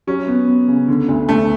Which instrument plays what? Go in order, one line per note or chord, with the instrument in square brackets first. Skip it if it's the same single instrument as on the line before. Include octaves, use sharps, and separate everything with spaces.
[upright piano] F#3 [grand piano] C#4
[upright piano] B3
B3
C#3
D3
D2
[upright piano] D2 [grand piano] A3